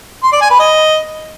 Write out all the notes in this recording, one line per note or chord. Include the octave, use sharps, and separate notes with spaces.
C6
D5
G#5
B4
D#5